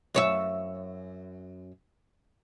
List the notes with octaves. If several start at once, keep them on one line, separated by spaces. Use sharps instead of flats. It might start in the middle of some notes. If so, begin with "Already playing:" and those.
F#2 C#5 E5